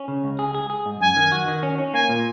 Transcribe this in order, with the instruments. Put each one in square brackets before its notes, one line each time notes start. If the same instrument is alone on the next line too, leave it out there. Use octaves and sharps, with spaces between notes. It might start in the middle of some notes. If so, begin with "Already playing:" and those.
Already playing: [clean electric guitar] C#4
C#3
C#2
G#4
G#4
G#4
G#2
[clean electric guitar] F#2 [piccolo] G#5
[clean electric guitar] D#3
F#4
D#3
C#4
C#4
[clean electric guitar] A#3 [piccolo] G#5
[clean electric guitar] A#2